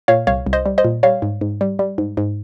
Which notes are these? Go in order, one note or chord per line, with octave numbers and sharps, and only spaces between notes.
A#2 C#5 F5
C2 C#5 F5
C2
C5 D#5
G3
C5 D#5
A#2
G3 C#5 F5
G#2
G#2
G3
G3
G#2
G#2